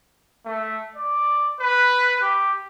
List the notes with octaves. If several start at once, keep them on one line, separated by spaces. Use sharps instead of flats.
A3
D5
B4
G4